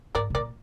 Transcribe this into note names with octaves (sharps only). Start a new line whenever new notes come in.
G#2 A#4 D5
C3
A#2 A#4 D5